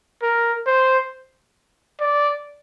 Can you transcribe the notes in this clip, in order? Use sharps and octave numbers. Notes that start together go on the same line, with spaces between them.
A#4
C5
D5